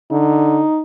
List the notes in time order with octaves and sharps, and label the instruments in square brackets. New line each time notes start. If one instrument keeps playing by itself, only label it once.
[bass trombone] D3 [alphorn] D#4